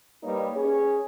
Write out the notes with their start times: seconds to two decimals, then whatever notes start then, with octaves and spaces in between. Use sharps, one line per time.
0.22 G3 A#3 D#4 B4 C#5
0.55 C#4 G#4 C#5